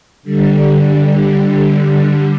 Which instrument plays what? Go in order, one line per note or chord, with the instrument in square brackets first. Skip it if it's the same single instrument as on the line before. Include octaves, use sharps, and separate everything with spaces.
[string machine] D3 G3